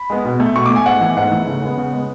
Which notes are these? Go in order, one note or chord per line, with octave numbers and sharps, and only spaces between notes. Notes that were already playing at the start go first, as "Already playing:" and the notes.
Already playing: B5
G#3 B3
B2
A3
B2 C#6
A3 D6
G#5
G#2 F#5
E3 A3
G#2 F#5
E3 A3
C#3
G#3 B3
C#3
G#3 B3